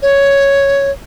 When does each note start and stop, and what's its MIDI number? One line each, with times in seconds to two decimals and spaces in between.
0.02 0.91 73